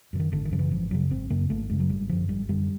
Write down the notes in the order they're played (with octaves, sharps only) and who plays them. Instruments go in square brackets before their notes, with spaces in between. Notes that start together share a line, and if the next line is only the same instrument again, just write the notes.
[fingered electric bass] F#2 C#3
D#3
G#1 D3
D#3
F#2 C#3 F3
E3
G#1 F3
F#2 C#3 F#3
G#1 C4
F#2 C#3 A#3
G#1 A3
F#2 C#3 G#3
F#3
G#1 G3
F#2 D3 F3
G#1 G3
F#2 D3 G3